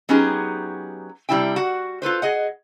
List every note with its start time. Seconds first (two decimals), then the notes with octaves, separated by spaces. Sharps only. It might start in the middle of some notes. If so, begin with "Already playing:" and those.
0.09 F#3 B3 C#4 D#4 G4 G#4
1.29 C3 G3 A3 D4 E4 G5
1.56 F#4 F#5
2.02 F4 A4 B4 C5
2.22 G#4 D#5 F#5